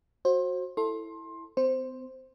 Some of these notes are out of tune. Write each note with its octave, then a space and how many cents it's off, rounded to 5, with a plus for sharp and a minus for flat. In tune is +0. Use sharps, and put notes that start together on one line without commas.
F#4 -10 C5 +25
E4 +0 A4 +10 C6 +20
C4 -45 C5 +0